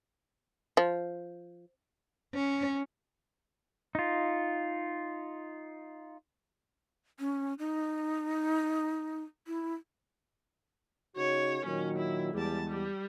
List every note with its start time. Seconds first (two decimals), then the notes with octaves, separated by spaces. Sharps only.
0.77 F3
2.34 C#4
3.95 D#4 F4
7.19 C#4
7.59 D#4
9.47 E4
11.17 C#3 D#4 F#4 C#5
11.65 A#2 D#3 F#3 C#4
11.98 E4
12.34 E2 G3 G#3 A5
12.69 G3